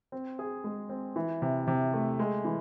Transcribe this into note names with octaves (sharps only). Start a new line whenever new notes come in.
C4
G#4
G#3
C4
E3
C3
C3
A3
G#3
E3